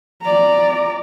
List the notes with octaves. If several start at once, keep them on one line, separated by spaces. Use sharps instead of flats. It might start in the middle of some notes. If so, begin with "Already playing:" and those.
D5 A#5